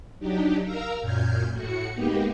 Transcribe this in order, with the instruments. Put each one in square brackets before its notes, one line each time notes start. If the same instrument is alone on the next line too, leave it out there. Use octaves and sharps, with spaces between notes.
[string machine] F#3 D4 D#4 G4
A#4 F5 A#5 E6
F#2 A#2 F6 G6 G#6
A2 F#4 C#7
G#3 A#3 B3 D#4 G4